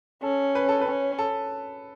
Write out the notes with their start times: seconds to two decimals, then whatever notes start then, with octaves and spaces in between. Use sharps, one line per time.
0.23 C#4 A4
0.55 B4
0.69 A4
0.81 B4
0.87 C#4
1.19 A4